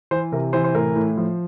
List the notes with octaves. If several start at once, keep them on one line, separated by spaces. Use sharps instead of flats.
E3 C5
C3 A#4
E3 C5
C5
A2 A#4
A2
F3